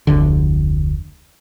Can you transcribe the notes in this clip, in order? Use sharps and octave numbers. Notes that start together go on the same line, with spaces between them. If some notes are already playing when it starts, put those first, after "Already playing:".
F1 D2 D3